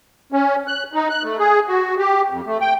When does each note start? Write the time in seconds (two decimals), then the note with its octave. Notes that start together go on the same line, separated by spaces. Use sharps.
0.32 C#4
0.68 F#6
0.93 D#4
1.10 F#6
1.23 A3
1.39 G#4
1.68 F#4
1.98 G4
2.30 F2
2.46 A3
2.61 G5